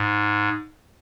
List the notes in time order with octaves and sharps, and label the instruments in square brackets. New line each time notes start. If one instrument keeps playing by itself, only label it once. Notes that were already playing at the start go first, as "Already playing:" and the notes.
Already playing: [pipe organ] G#2